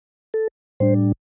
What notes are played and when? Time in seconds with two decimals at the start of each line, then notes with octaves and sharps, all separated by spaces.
0.34 A4
0.80 A2 G3 D4 C5